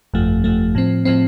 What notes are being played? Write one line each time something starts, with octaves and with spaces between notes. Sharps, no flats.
G1 F2 F3 A3
G1 F2 F3 A3
A2 F3 C4
A2 F3 C4